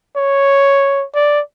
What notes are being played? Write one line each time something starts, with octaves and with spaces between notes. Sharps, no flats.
C#5
D5